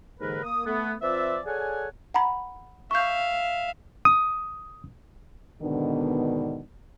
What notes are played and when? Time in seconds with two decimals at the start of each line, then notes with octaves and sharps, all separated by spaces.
0.20 D#2 G#2 D3 E3 A#4 B4
0.43 A#3 D#6
0.66 A3 B3
1.02 F3 C4 F4 B4 D5 E5
1.46 G#4 A4 C#5 D5 F#5 G#5
2.14 F#5 A#5 B5
2.91 E5 F5 C#6 G6
4.05 D#6
5.62 G#2 B2 D3 D#3 B3 D4